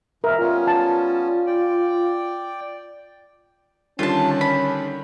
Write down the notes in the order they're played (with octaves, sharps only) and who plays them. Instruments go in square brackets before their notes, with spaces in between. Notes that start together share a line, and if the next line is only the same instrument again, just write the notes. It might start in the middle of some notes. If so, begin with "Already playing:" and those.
[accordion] G#2 B2 E3 [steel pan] A#4 [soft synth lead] E5
[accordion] G3 B3 C#4 [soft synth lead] F4
[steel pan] A5
[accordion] D5 G5
[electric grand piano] D3 D#3 G3 [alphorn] C#4 [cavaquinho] F4 A5
[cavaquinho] B5